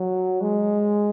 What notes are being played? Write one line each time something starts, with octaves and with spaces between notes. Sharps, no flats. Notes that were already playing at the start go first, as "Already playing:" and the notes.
Already playing: F#3
G#3